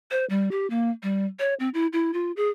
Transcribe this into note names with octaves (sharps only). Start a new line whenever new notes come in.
C5
G3
G4
A#3
G3
C#5
C4
E4
E4
F4
G#4